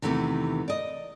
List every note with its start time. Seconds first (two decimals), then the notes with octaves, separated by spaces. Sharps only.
0.02 E2 C3 D#3 E3 A3 B3
0.68 D5 D#5